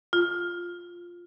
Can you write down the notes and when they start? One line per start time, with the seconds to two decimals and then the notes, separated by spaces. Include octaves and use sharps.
0.13 F4